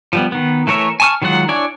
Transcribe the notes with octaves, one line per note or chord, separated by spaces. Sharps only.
F3 G3 B3
D#3 B3
E3 A3 A#4 C#5 E5
G#5 A5 C#6 D#6 F6
D#3 F#3 G#3 F4 F#5
D4 E4 C#5 D5 G#5